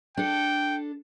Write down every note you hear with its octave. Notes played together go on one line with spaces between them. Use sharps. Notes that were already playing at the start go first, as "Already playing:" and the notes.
D4 A4 G5